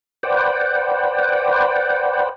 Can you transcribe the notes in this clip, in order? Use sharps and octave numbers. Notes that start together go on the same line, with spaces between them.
B4 C5 D5 F#5 G5